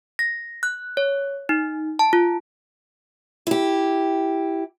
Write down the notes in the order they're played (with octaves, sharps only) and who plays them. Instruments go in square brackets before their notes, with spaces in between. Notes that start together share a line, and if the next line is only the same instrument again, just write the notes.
[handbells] A#6
F#6
C#5
D#4
A5
F4
[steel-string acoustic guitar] E4 G4